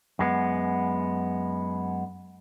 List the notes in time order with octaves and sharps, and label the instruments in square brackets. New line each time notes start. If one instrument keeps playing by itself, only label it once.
[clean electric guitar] F#2 G#3 B3